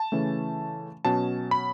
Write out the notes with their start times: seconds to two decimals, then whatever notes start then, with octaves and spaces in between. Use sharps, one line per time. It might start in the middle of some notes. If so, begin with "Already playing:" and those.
Already playing: A5
0.12 C#3 E3 A3 C#4
1.05 B2 F#3 C#4 A5
1.51 B5